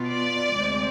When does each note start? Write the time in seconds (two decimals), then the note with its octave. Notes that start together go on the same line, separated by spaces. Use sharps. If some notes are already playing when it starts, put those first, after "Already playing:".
Already playing: B2 B3 F4
0.10 D5
0.52 D2 C3 G#3 C4